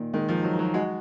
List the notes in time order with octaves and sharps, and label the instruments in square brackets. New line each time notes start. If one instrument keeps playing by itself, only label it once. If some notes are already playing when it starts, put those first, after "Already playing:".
Already playing: [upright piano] A#2 [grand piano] D#3
[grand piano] D#3 [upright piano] G#3
[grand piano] F3
[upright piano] D#4
[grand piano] F#3
[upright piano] D#4
[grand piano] F#3
[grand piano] G#3 [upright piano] F#4